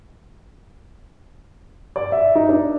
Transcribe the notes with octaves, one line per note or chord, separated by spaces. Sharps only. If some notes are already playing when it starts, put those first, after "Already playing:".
D5
E5
D#4
D4